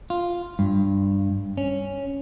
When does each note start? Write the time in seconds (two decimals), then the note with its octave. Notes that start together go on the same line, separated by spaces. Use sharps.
0.10 F4
0.59 G2
1.57 C#4